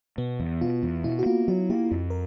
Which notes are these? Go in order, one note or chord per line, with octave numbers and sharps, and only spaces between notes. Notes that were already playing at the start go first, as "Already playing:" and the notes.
B2 B3
E2
B2 F4
E2
B2 E4
F#4
A#3 F4
F#3 F#4
A#3 G4
F2
A#4